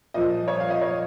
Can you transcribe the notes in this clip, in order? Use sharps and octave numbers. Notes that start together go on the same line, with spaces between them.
A#2 F3 D#5
C#5
F5
D#5
C#5